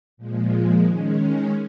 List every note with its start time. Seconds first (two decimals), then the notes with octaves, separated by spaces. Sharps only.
0.17 A#2 F3 G#3
0.85 D#3 G#3 C#4